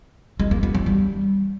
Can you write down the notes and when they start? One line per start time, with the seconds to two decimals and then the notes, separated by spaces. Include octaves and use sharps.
0.40 G#3
0.51 A#3
0.63 B3
0.75 E3
0.86 G3